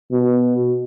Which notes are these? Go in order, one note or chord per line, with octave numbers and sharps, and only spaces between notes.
B2